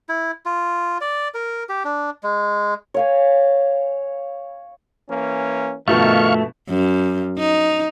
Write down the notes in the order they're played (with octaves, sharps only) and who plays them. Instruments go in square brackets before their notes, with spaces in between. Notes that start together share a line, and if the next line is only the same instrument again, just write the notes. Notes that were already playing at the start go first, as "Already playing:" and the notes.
[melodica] E4
F4
D5
A#4
G4
D4
G#3
[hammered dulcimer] C#5 F5 G#5
[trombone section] E3 A#3 C#4
[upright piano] G1 B2 F3 [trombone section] D#3 [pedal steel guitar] A3 [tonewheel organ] F5 C#6
[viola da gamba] F#2
D#4